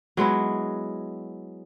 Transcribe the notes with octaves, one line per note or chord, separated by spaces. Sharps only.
F#3 G#3 B3 E4